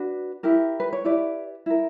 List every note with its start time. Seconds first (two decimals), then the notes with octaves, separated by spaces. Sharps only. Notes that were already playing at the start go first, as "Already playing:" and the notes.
Already playing: D4 F#4 B4
0.43 E4 G4 A#4
0.80 B4
0.93 C#5
1.04 E4 G4 B4 D5
1.66 E4 A#4